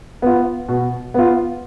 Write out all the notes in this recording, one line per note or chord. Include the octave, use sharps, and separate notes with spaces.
B3 F4
B2
B3 F4